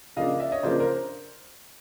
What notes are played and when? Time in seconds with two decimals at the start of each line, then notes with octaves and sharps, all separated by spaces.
0.16 C#3 F3 A#3 D4 D#5 F5
0.40 D5 E5
0.52 C#5 D#5
0.63 C#3 F3 A#3 D4 C5 D5
0.80 A#4 C5